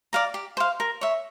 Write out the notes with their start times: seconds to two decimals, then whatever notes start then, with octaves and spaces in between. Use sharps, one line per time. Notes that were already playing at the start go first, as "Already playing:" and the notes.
0.13 D5 F5 A#5
0.34 G4
0.57 C5 F5
0.80 A#4
1.01 C#5 E5